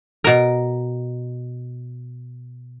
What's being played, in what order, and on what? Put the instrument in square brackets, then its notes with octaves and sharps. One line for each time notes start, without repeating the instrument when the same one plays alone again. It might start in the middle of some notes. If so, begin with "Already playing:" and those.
[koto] B2 A#4